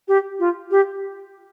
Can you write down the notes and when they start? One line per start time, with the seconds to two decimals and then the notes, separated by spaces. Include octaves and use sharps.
0.08 G4
0.39 F4
0.71 G4